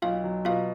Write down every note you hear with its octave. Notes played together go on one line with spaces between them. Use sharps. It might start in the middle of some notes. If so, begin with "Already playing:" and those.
B1 F4 F5
F#3
B2 F4 F5